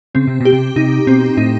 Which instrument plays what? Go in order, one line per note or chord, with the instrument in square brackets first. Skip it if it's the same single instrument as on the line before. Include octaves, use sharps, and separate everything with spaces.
[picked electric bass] C#3 [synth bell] C4
[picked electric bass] C3
[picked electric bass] B2 [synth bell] G4
[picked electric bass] C3
[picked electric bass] C3 [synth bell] D#4
[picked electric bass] B2 [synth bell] C4
[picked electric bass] A2 [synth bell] D#4